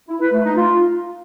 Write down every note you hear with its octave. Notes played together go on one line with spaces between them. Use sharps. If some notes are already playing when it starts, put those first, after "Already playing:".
E4
B4
A3
D#4
F4